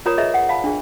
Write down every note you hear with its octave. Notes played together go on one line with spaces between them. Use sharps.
F4 A#4 C#5 D5 A#5 D#6
G#4 B4 C#5 D#5 E5 A#5
F#5
F5 A5 B5
D4 G#4